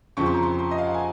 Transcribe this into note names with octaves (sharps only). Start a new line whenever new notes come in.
F2 C#3 F3 C4 C#6
C6
A#5
C6
C6
D#5
F5
F#5
G#5